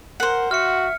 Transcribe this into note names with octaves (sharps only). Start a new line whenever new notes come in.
A#4 C5 F#5
F#4 E5 F6 C#7